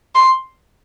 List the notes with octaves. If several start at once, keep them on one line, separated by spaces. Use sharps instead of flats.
C6